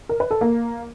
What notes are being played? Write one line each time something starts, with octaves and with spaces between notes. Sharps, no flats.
A#4
B4
A4
A#3